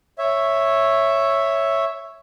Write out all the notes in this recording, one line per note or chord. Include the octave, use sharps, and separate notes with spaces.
C#5 E5